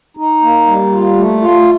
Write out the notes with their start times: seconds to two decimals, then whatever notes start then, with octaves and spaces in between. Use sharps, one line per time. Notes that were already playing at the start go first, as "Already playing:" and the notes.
0.17 D#4
0.42 A#3
0.67 G3
0.92 F4
1.16 A3
1.41 F4